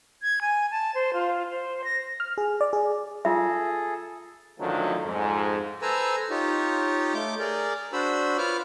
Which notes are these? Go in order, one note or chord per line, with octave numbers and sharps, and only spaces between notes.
G#6
G#5
A5
C5
F4
C5
A#6
F6
G#4
D5
G#4
F4 G#4 A4 E5
F#2 D3 D#3 F3 F#3 A3
F2 G#2
A4 B4 C5 G#5 A#5 E6
D#4 F4 G4 C#5
A3 D6 G6
G#4 A#4 D5
D4 F#4 C5 B5 E6
F4 B4 C#5 D6 F6